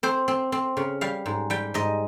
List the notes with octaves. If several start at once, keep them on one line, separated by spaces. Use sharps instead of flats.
C4 C5
C4
C4
C#3
G3 F5
G#2
G3 G5
G#2 D#5